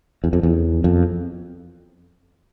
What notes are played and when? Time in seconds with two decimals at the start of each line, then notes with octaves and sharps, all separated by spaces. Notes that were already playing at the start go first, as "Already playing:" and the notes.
0.24 E2
0.33 F2
0.43 E2
0.84 F2